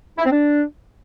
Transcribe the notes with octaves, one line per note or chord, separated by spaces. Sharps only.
E4
C4
D4